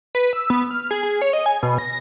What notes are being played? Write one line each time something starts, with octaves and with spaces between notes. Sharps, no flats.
B4
E6
B3
F6
G#4
G#4
C#5
D#5
G#5
B2
A#6